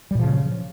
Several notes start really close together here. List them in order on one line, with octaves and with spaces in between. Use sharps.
G3 A#2 F3 C#3